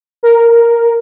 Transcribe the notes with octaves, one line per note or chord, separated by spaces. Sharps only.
A#4